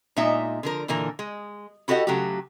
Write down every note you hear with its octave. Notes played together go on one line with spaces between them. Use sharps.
A#2 G#3 D#4 E5
D3 F3 A#4
A#2 D3 E3 A#4
G#3
E4 F#4 G4 A4 D#5 F#5
C#3 F#3 A3 F#4 G4